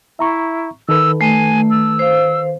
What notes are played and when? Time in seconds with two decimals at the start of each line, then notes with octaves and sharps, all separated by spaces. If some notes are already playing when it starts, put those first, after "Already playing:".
0.19 E4 E5 A#5 C#6
0.89 D#3 A4 B4 E6
1.21 A3 G#5
1.70 E6
1.99 C5 F5